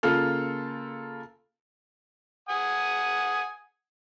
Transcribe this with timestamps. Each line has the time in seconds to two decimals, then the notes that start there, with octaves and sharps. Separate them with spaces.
0.03 C#3 A#3 F4 A4 F6
2.49 F#5 G#5 D#6